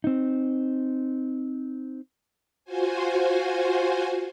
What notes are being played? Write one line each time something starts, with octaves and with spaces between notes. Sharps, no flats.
C4 D#4
F4 F#4 C5 G#5